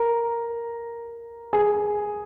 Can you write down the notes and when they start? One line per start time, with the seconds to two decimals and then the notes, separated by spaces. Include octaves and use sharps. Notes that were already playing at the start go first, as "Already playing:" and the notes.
Already playing: A#4 A#5
1.53 G#4 G#5